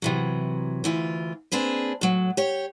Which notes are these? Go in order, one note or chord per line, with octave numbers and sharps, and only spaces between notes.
C3 E3 F#3
D2 E3 F4
A#3 C4 D4 G#4 B4
A2 F#3
G4 C#5